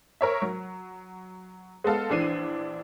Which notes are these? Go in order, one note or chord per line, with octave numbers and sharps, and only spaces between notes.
A#4 C#5 E5
F#3
G#3 B3 A4 F5
A#1 E3 D4 C7 D#7